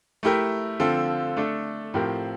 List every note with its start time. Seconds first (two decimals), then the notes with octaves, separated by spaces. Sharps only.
0.23 A3 E4 G4 A#4
0.80 D3 F3 C4 F4 A4
1.37 A3 D4 A4
1.94 A2 F3 C4 G4 A#4